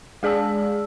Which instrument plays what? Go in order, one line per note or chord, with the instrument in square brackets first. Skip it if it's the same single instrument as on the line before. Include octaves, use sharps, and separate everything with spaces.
[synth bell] G#3 G#4 D5 A5 E6